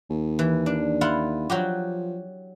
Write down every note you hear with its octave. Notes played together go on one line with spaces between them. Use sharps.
D#2
E3
D4
E4 F4 F#5
F3 F#3 F#4 G4